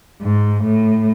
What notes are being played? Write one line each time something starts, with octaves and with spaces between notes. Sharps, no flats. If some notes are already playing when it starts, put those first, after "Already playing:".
G#2
A2